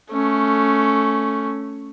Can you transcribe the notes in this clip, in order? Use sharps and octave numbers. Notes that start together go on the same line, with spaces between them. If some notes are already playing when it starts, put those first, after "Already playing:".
A3 C#4